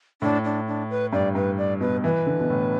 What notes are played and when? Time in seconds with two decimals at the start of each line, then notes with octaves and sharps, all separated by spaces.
0.22 A2 D4
0.44 D4
0.67 D4
0.90 B4
1.13 G2 D5
1.35 G2 B4
1.58 D5
1.81 B2 B4
2.04 E3 B4
2.26 D3
2.40 B2
2.50 A2